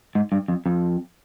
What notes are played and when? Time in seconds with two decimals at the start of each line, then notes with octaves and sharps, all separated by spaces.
0.15 G#2
0.32 G2
0.48 F2
0.66 F2